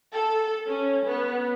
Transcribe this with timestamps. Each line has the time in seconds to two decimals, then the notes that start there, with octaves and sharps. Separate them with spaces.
0.12 A4
0.67 C#4
1.06 B3